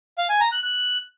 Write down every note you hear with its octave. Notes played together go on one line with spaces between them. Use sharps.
F5
G#5
A#5
F#6
F#6